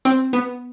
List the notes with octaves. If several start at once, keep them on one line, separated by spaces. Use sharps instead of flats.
C4
B3